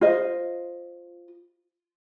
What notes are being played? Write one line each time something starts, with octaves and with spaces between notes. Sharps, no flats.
F4 C5 D#5